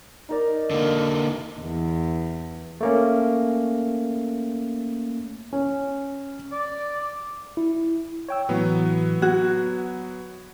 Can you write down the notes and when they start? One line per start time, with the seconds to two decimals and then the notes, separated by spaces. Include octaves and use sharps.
0.29 D#4 A#4 D5
0.71 D3 A#3
1.60 E2
2.81 A3 A#3 C#4
5.53 C#4
6.52 D5
7.57 E4
8.29 C#5 G5 E6
8.49 A2 E3 F#3 B3
9.22 F#4 G#6